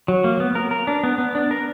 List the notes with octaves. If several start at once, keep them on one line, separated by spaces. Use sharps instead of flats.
F#3
A#3
B3
A#4
A#4
D4
B3
B3
D4
A#4